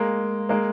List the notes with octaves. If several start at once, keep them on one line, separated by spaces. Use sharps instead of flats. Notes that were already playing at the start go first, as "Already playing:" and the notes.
Already playing: G#3 A#3
G#3 A#3